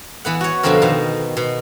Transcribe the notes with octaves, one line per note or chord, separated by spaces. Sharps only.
E3 B3 F#5
F#4 C#5
F2 B2 D3 F3 C4 A#4
B2 D#3 A#5
B2